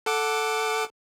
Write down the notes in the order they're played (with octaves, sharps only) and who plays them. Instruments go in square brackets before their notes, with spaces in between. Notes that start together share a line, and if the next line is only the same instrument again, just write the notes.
[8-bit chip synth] A4 F#5 D6